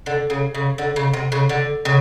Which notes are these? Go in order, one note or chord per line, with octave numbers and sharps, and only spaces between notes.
D3
C#3
C#3
D3
C#3
C3
C#3
D3
C#3